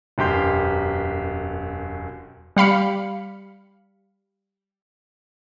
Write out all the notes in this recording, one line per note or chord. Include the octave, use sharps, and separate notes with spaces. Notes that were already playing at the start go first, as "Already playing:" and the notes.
E1 F#2 B2 G4 C6 G6
G3 F5 B5 C#7